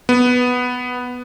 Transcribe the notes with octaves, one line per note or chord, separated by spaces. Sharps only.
B3